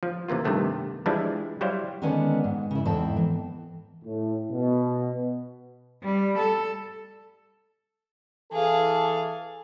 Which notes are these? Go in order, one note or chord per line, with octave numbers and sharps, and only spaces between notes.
F3
C3 E3 A#3 F4
G2 C3 D#3 A3 B3
E3 F3 G3 G#3 D4 E4
F#3 G3 E4 C5 F5
D3 D#3 G#3 B3 C#4 D4
G#2
C#3 E4
E2 G#2 C4 E4 A4 G5
E3
A2
B2
G3
A4
E3 G#4 A4 F5